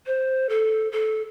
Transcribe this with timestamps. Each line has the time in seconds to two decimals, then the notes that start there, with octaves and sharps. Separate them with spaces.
0.06 C5
0.49 A4
0.92 A4